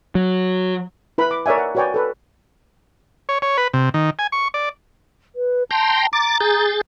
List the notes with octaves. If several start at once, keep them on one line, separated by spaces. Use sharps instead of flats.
F#3
E4 B4 B5
D6
A#4 C#5 D5 E5 G#5
F#5
F#4 B4 C#5 D5 G5 G#5
A4 B4
C#5
C#5
B4
C3
D#3
G#5
C#6
D5
B4
G5 A5 A#5 C6
A#5 D6 A6
G#4 G6 A6